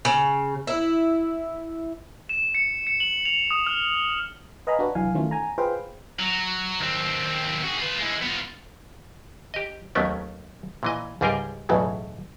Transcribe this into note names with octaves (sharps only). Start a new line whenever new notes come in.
C#3
E4
E7
C#7
C#7
F#7
F7
D#6
F6
B4 D#5 F5 G#5 A#5 B5
D4 F#4 B4
C2 E3 F#3 F5 G#5
D#3 E3 A3 C#4 F4
G#5 A#5
F4 G#4 B4 C5 F5 G5
F#3
D#2 C4
F#4 G#4
F4 B4
G#3 E4
B3 F4
G4 D#5
D#2 D#3 F#3 A3 B3 C#4
A#2 E3 D#5
C#2 G#2 G3 G#4 A#4 G5
B1 E2 A2 C#3 F#3